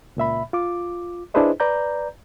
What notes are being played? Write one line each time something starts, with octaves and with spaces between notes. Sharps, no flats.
C#2 A#2 E5 B5
F4 D6
D4 E4 G#4 B4 C5 D#5
B4 D5 A#5 G6